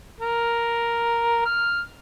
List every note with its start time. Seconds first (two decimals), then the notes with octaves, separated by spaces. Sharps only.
0.20 A#4
1.46 F6